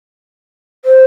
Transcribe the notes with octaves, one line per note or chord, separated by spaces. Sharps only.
C5